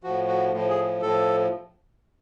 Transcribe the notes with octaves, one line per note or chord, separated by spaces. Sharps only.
A2 F3 F#4
F#4
A2 F3
G#4
A2 F3 A4